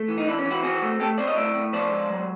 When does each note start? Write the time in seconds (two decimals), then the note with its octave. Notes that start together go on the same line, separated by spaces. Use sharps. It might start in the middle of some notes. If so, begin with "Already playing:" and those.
Already playing: A3
0.08 E3
0.18 D#4
0.26 E3 D4 E4
0.39 C#4
0.45 E3
0.51 E4 F#4
0.63 C4 F#4 G#4
0.82 A3
1.00 A3 G4 A4
1.18 C4 C5 D5
1.27 C#5 D#5
1.36 A2 D5 E5
1.55 A2
1.73 F3 C5 D5
1.91 G#3
2.10 F#3